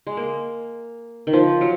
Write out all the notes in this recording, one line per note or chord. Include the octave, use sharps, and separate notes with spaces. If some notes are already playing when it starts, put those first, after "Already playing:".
G#3
A#3
D#3
F3
F#3